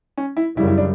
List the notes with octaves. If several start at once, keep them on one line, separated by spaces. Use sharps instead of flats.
C#4
E4
F#2 C#3 G3 E4
E4
D4